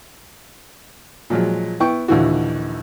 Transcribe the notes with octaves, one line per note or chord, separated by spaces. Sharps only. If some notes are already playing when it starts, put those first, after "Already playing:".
A#2 F3 F#3 G#3
B3 E4 G5 C#6
A#1 D#2 D3 E3 E4 F#4